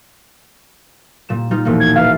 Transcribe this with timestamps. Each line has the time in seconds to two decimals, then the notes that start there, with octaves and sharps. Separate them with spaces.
1.29 A#2 G3 E7
1.51 G3 D#4 F4
1.65 E1 A#1 A#3
1.80 G#6
1.96 E3 E5 F5 A6